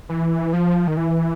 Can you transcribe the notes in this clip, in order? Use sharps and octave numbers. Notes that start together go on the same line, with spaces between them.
E3
F3
D#3
E3